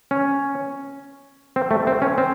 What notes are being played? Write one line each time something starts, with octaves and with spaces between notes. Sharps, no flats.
C#4
C4
A3
C4
C#4
C4